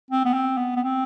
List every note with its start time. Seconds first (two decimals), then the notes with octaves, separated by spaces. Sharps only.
0.11 C4
0.25 B3
0.33 C4
0.57 B3
0.76 B3
0.79 C4